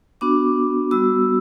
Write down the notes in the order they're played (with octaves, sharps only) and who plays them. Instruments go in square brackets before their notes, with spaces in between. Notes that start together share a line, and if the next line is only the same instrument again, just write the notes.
[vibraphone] B3 D4 F#4 D6
G3 B3 F#4 E6